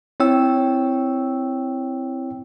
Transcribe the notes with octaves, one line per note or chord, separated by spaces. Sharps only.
C4 E4 C#5 G5 E6